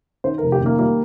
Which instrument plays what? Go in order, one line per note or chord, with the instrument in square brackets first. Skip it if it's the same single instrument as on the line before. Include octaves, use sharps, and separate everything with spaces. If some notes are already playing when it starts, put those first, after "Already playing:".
[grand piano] D#3 C5
A#4
F1
G4
D#3 A#3
G3 A#3